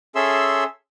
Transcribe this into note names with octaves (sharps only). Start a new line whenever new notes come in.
C#4 G#4 A4 E5 C6 E6